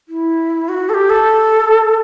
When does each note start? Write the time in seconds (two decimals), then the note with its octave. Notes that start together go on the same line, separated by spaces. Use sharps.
0.09 E4
0.69 F#4
0.89 A4
0.94 G4
1.10 A4